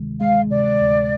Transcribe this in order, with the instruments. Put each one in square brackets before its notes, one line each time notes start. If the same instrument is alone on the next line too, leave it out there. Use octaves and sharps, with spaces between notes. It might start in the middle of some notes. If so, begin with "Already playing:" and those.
Already playing: [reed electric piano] D2 C3 D#3 G#3
[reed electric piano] G#3 [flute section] F5
[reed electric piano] C3 [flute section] D5
[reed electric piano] D2